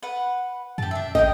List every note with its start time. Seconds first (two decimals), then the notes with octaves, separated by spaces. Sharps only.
0.03 B4 F#5
0.78 F#2 G4 A5
0.91 D4 E5
1.15 A1 G4 A#4 D#5 G5